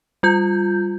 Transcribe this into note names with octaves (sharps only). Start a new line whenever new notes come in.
G3 F4 G6